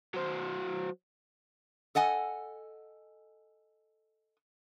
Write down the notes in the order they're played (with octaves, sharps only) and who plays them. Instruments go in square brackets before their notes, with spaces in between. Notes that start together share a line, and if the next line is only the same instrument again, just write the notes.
[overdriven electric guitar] F#3 C5
[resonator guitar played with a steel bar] A4 D#5 F#5 G#5